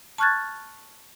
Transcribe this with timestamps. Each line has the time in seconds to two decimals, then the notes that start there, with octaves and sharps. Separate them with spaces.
0.18 A5 C#6 F6 F#6 G#6 A6